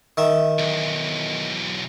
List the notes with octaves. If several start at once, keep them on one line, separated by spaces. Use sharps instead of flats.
D#3 E5
B1 E2